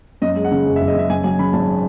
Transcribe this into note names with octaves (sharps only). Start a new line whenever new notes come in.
F#2 D#5
G#3
F#5
C#3
F#1
E5
F#1
D#5
C#3 E5
F#2 G#5
F#3 G#5
C#3 B5
G#1 A5